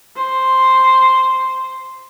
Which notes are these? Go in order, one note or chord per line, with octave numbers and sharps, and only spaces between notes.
C5